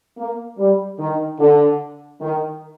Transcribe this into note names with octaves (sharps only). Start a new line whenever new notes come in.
A#3
G3
D#3
D3
D#3